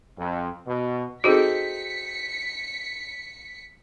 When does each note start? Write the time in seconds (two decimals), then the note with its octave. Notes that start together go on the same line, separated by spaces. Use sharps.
0.17 F2
0.67 B2
1.24 C4 D#4 F#4 G#4 A4 B6 C#7